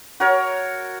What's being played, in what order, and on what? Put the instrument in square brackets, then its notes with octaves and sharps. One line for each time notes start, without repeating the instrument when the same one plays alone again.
[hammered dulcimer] F#4 A#4 C#5